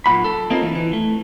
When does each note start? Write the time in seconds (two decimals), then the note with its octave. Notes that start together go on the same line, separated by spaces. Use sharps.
0.06 B1 E2 A#2 F#4 B5
0.24 A4
0.50 A#3 C4 C#4 D#4 F4 A4
0.63 E3
0.75 E3
0.93 A3